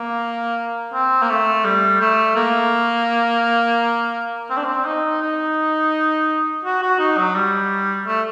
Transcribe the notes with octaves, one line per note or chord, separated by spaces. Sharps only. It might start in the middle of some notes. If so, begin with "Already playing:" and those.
Already playing: A#3
C4
A#3
A3
G3
A3
A#3
C4
D4
C4
D#4
D#4
F#4
F#4
D#4
F#3
G3
A3